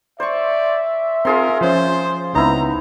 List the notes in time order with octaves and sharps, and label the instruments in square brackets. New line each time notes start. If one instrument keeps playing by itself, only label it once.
[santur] C5 C#6 [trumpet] D5 [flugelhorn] E5
[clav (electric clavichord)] C4 [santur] F4 G#4 C6 [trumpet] A#4
[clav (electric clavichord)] F3 C#4 [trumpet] C5
[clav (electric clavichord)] C#2 B3 C4 [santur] D#4 E4 [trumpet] A#5